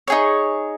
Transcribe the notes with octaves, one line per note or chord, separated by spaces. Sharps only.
D#4 G#4 C#5